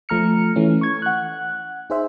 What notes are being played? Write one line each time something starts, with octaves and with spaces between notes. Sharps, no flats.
F3 A3 A#5 F6 C#7
E3 A3 C#4
C#6 G#6
F#5 F#6
D#4 G#4 C5 E5